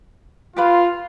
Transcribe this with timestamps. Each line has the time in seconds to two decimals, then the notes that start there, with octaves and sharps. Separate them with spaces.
0.57 F4 G4 B4 F5 B5